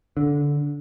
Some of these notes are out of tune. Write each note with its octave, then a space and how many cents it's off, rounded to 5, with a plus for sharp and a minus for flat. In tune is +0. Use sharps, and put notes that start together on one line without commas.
D3 -15